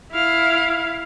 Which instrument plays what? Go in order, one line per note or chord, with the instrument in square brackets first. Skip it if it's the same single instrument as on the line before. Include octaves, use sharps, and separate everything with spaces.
[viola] E4 F5